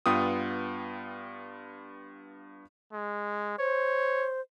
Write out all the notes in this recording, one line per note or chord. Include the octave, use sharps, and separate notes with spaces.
G2 B3 F4 G5 D#6
G#3
C5 C#5